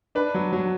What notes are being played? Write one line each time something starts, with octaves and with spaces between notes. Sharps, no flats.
D4 B4
F#3
F#3